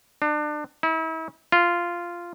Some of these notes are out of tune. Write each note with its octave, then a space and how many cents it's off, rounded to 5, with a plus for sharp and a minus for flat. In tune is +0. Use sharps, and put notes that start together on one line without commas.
D4 +30
E4 -40
F4 -10